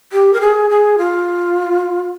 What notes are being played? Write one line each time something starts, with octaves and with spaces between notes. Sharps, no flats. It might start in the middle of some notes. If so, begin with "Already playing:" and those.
G4
A#4
G#4
G#4
F4